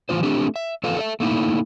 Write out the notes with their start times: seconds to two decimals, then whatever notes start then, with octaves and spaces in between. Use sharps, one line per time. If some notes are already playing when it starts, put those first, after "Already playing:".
0.09 A2 E3 C4 F4 C5
0.23 A3 C4 D4 G4
0.56 E5
0.84 E2 F4 A4 B4 F5
0.96 A4 D5 E5
1.20 A3 A#3 D#4 E4